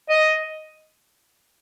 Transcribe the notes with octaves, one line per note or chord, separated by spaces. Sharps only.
D#5